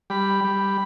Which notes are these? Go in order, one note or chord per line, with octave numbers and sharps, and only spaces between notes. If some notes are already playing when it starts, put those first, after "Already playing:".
G3 B5
G3